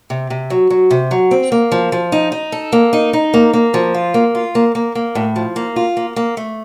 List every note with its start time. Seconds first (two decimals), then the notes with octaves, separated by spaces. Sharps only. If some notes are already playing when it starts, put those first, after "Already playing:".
0.10 C3
0.30 C3
0.50 F#3
0.70 F#3
0.91 C3
1.11 F#3
1.31 C4
1.52 A#3
1.72 F3
1.92 F3
2.12 D#4
2.32 D#4
2.52 A4
2.72 A#3
2.93 D#4
3.13 D#4
3.34 A#3
3.53 A#3
3.74 F3
3.94 F4
4.14 A#3
4.35 F4
4.55 A#3
4.75 A#3
4.95 A#3
5.15 A2
5.36 F3
5.56 A#3
5.76 F4
5.97 A#3
6.16 A#3
6.37 A3